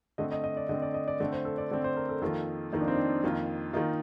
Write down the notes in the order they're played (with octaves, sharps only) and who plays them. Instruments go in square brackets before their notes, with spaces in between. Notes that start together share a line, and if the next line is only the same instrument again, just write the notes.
[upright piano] D3 A3 C4 [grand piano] D#5
[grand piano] D#5
D#5
D5
[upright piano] D3 A3 C4 [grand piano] D#5
[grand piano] D5
D#5
D5
[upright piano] D3 A3 C4 [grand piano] D5
[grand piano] C5
A4
D5
[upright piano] D3 A3 C4 [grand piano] D5
[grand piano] C5
A#4
A4
[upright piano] F2 D#3 A#3 F4 [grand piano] A4
[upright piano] F2 D#3 A#3 F4 [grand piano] D#4
[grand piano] D4
C4
D4
[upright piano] F2 D#3 A#3 F4
[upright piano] D#3 A#3 F4 [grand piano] D#4